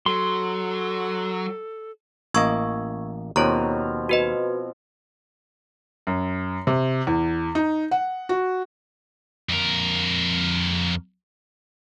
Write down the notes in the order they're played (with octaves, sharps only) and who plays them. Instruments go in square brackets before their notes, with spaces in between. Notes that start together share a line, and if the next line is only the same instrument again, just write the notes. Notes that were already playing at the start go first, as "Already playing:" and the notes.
[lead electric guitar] F#3 [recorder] A4 [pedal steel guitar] C6
[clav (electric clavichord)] A1 A#3 D#5 [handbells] C#6 E6 G#6
[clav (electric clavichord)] D#2 [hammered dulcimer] B2 F3 C4 [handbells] C#5 A#5
[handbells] F#4 B4 D#5
[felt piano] F#2
C3
E2
D#4
F#5
F#4
[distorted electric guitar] F2 A#4